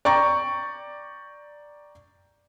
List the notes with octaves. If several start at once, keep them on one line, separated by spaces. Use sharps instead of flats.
D5 G5 A#5 C#6